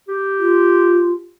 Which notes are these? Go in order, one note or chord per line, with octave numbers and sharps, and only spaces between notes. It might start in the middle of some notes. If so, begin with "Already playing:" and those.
G4
F4